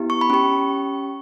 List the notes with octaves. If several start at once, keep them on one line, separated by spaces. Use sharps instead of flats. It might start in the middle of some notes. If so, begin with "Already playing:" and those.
Already playing: B3 E4 G4
C#6
B5
C#4 G4 C#6